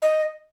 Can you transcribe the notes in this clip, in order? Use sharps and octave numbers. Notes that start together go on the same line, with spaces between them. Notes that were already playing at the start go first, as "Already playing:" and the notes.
D#5